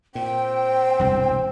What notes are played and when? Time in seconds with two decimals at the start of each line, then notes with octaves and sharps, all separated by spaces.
0.15 A#2 C4 G5
0.99 E1 C2 G2